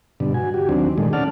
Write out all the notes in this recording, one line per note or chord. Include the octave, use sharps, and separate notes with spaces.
G2 B2 D3
F#4 G#5
F#4 G4
D#2 F#3 C4 D4
A#2 D#3 G#3 A3
C#4 D5 F#5 A5 F6